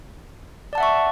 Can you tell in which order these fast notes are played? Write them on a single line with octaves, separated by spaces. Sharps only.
D5 A5 F#5 E5 C#6